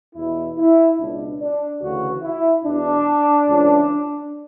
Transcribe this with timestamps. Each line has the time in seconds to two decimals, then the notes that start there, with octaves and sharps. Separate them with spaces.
0.15 E2 B2 E4
0.57 E4
0.98 C#2 B2 D4
1.40 D4
1.81 D2 C#3 E3 F#4
2.22 E4
2.64 E2 B2 D4
3.47 C#2 C#3 E3